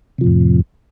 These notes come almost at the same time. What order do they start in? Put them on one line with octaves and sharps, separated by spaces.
C3 F3 A2 F2